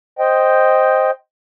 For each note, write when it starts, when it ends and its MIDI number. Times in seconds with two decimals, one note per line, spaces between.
0.19 1.11 72
0.19 1.11 75
0.19 1.11 79